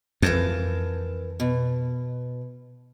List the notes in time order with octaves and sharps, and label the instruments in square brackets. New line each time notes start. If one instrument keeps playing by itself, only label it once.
[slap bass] F2 [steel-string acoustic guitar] E3 A#4 A5
[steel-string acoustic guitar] B2